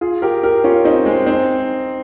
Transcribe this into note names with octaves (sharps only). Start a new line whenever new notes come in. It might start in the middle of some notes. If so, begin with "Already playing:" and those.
F4 G#4
G4 A#4
G4 A#4
C#4 F4
C4 D#4
G#3 C4
C4 D#4